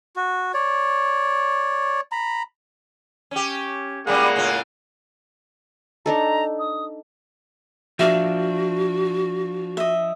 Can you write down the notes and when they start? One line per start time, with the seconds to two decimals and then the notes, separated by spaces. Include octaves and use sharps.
0.16 F#4
0.54 C#5 D5
2.12 A#5 B5
3.31 C#4 G4
4.07 A#2 G3 G#3 A#3 C#4 F#5
4.36 A2 C#3 F4
6.06 D4 D#4 A4 A#5
6.59 D#6
7.99 F3 D4 F#4 E5 F5 D6
9.77 D#5 E5